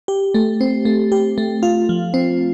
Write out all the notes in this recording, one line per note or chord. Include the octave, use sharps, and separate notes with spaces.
G4
A3
C4
A3
G4
A3
F4
F3
C4